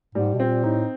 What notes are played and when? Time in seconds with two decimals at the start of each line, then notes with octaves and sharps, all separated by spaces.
0.15 G#2 G3
0.34 B2
0.40 A#2 C4
0.64 A2 D#4